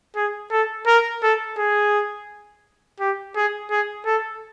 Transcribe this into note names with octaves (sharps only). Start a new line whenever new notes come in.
G#4
A4
A#4
A4
G#4
G4
G#4
G#4
A4